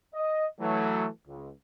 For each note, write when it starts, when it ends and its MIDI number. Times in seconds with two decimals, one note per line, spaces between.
0.14 0.46 75
0.61 1.08 52
0.61 1.08 54
0.61 1.08 57
1.27 1.50 37